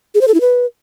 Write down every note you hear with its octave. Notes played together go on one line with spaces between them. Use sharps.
G#4
C5
A4
E4
B4